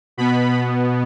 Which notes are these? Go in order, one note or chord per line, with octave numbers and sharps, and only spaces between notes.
B2 B3 B5